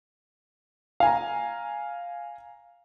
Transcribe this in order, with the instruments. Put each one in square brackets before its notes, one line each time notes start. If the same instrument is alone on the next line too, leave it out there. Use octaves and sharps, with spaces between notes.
[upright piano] F5 G#5 A#5